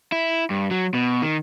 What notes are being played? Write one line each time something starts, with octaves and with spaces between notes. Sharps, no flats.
E4
G2
F#3
B2
D#3